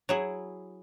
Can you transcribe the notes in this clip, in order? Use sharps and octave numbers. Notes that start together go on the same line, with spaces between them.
F#3 E4 G#4